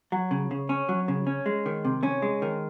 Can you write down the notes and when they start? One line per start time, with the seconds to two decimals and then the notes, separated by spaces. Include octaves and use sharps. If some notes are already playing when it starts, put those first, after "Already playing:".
0.12 F#3
0.31 C#3
0.51 C#3
0.69 C#4
0.89 F#3
1.08 C#3
1.27 C#4
1.46 G#3
1.66 D#3
1.85 C3
2.03 C#4
2.22 G#3
2.42 D#3